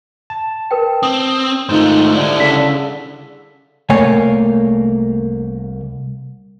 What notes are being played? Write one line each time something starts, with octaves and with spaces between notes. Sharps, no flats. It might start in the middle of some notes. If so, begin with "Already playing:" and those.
A5
A#4 B4 G5
C4 D#6
G#2 D#3 A3 F4 C5
D3 G3 E4
C#3 A4 B6
C2 A3 A#3 C#5 G#5